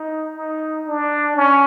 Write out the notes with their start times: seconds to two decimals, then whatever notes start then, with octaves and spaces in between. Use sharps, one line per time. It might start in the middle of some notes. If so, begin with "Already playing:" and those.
Already playing: D#4
0.36 D#4
0.87 D4
1.37 C#4